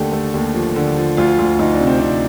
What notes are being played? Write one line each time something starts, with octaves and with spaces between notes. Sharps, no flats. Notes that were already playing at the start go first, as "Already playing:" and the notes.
Already playing: D#2 D3 A3 G4 A4
A3
D#2
F3
D3
F3
D2 F4
D2
D2 D#4
D4
C3
C4
C3 D4